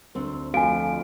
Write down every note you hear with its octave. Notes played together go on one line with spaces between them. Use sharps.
D2 C4 C5
F2 A3 F#4 F5 G#5 D7